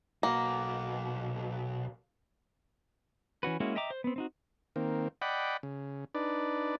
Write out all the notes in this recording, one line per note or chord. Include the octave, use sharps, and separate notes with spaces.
B1 A#3 F#4
E3 C#4 F#4 B4
G#3 A#3 C#4 E4 F#4
D#5 E5 G5 A#5 D6
C5
B3 C4
C4 D#4 F#4
D#3 A#3 C4
D5 D#5 F#5 G5 B5
C#3
D4 D#4 B4 D5